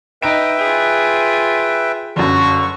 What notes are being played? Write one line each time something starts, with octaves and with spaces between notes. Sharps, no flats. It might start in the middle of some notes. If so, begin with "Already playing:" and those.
D#4 B4 E5 G5 D7
F4 G#4
G1 F#2 F#4 C#6